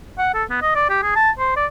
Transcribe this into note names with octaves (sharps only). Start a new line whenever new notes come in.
F#5
A4
B3
D#5
D5
G4
G#4
A5
C5
D5